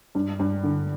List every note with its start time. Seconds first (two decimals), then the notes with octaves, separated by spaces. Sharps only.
0.15 G2
0.39 G2
0.64 D3